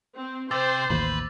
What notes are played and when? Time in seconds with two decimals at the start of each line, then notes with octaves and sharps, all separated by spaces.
0.17 C4
0.51 C3 C5 D6 E6 A6
0.90 A1 D#2 B4